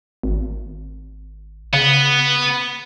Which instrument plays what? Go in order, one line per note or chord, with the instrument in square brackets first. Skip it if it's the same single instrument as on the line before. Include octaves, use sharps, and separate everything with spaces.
[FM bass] G#1
[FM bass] C#3 [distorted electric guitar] B3